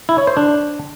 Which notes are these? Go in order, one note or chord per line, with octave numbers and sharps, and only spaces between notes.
E4
C#5
C5
D4